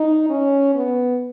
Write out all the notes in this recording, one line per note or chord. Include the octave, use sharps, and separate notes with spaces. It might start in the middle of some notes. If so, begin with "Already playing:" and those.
Already playing: D#4
C#4
B3